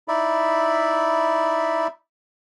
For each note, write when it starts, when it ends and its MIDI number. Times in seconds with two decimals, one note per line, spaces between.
0.08 1.87 63
0.08 1.87 64
0.08 1.87 74
0.08 1.87 76
0.08 1.87 83